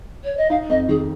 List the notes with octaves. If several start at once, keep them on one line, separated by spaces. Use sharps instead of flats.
C#5
D#5
D#4 F5
F2 D#5
D#3 G#4